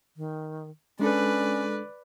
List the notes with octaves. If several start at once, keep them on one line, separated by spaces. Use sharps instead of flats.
D#3
G#3 C#4 D4 A4 B4 D5